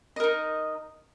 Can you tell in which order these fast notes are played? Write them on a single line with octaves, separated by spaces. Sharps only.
D#5 A#4 D#4